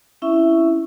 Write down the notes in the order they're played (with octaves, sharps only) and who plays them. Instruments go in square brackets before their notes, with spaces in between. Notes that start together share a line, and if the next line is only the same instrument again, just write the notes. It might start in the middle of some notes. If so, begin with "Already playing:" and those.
[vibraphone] C4 C#4 E4 E5 C#6